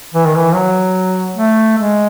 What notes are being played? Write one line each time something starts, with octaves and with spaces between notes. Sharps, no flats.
E3
D#3
E3
F#3
A3
G#3